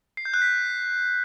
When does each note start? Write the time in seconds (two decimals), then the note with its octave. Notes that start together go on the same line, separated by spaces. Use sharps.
0.17 C7
0.25 G6
0.34 F#6
0.42 B6